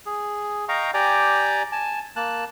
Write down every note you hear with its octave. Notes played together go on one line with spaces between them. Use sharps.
G#4
D#5 F5 G5 A#5 C#6
G4 D5 G5 G#5 A#5
G#5 A5
A#3 A5 F#6